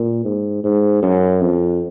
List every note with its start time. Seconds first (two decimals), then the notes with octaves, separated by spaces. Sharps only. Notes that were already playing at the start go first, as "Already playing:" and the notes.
Already playing: A#2
0.25 G#2
0.64 G#2
1.02 F#2
1.41 F2